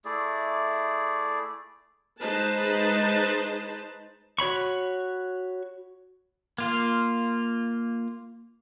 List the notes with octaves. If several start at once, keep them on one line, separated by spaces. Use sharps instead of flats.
A3 E4 G#4 D5
G#3 D#4 B4 C5 A5
F#4 C#5 B5 C#6
A#3 F4